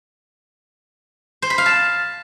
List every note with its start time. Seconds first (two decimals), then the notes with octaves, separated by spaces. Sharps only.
1.42 C5
1.50 B5
1.58 F5
1.66 A5